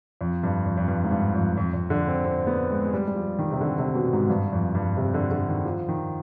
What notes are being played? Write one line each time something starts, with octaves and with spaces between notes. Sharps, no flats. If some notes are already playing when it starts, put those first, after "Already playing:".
F2
G2
F2
F2
G2
G#2
G2
F2
F2
F2
D3
C4
C4
B3
G#3
G#3
G3
G3
F3
D#3
C3
D3
C3
B2
G#2
G2
F2
G2
C3
D3
D3
D#3
F3
D#3